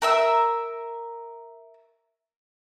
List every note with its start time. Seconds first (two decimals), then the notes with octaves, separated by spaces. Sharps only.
0.02 A#4 E5 E6